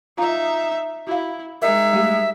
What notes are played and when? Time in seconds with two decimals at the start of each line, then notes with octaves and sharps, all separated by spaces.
0.18 D#4 F4 E5 F5 A#5
1.07 E4 F#4 F5
1.62 G#3 D#4 A#4 D#5 E5
1.93 G3 A3 G4